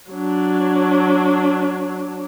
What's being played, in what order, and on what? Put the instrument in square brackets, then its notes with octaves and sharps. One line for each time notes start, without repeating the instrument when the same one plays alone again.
[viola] F#3 D4